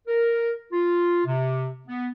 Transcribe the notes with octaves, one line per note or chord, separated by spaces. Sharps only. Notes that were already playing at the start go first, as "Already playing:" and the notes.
A#4
F4
C3
B3